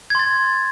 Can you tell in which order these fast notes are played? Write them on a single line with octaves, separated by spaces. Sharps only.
G#6 C6 A6